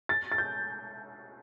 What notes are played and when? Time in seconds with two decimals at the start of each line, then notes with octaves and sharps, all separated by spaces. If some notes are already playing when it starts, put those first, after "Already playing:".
0.09 A6
0.32 A6
0.38 G6